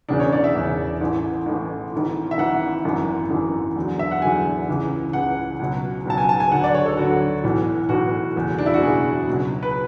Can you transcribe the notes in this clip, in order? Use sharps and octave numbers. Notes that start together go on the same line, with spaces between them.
E1 E2 C#3 D4
C#5
D5
E5
E1 E2 C#3
A1 A2 E3
A1 A2 E3
G#1 G#2 E3
E5
G#1 G#2 E3 F#5
G#1 F#2 E3
G#1 F#2 E3
E2 D3 F#3
E5
F#5
E2 D3 F#3 G#5
C#2 C#3 E3
C#2 C#3 E3 F#5
C#2 B2 F#3
C#2 B2 F#3 A5
G#5
A5
G#5
D2 D3 F#3 F#5
D5
C#5
A4
D2 D3 F#3 F#4
B1 A2 E3
B1 A2 E3 F#4
F#1 E2 B2
D4
E4
F#4
F#1 E2 B2 G#4
C#2 B2 F#3
B4